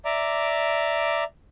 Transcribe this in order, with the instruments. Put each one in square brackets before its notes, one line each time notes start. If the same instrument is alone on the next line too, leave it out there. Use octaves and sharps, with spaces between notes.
[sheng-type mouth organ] D5 E5 A#5 D6